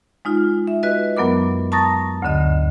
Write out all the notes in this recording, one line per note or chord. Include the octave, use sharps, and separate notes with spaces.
G#3 D#4 F4
E5
F#4 B4 D#5
F#2 F#3 B3 A#4 D6
A5 A#5 C#6 D#6 A6 A#6
D2 G2 D3 D#5